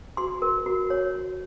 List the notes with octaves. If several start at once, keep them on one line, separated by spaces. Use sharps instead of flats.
F#4 C6
A#4
F#4
C#5